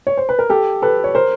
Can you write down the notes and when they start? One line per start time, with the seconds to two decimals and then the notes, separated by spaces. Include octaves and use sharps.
0.07 C#5
0.17 C5
0.29 B4
0.39 A#4
0.50 G4 A4
0.82 A4 B4
1.04 C#5
1.15 A#4 C5